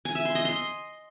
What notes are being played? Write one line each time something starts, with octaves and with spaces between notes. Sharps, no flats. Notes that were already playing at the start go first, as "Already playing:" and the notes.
G#5
E5
C6
D#5
C6